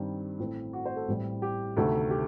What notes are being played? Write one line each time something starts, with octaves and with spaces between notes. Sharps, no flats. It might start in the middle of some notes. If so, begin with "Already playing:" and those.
Already playing: G2 D#3 G3 C4
A1 A2 A3 C4
F#4
C5
A4
A1 A2 G3 C4
G4
D2 C3 D#3 A3 A4
G4